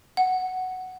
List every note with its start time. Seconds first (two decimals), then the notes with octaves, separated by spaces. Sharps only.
0.17 F#5